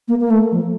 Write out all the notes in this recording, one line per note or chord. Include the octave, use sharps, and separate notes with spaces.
A#3
A#3
A3
F3